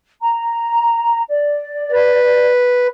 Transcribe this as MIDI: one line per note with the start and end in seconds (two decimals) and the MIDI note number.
0.21 1.22 82
1.29 2.50 74
1.92 2.87 71